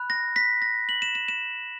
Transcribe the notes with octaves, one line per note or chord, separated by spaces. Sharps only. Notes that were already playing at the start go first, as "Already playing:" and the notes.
Already playing: B5 F#6
A#6
B6
A#6
F#7
E7
E7
E7